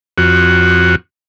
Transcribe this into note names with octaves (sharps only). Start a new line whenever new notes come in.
F2 F#4